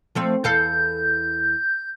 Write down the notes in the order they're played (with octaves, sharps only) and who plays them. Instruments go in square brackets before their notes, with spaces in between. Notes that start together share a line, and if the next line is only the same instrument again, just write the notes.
[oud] F3 A3 C4
[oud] E2 A4 F5 [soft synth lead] G6